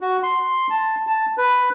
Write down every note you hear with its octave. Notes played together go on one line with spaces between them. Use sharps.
F#4
C6
A5
A5
B4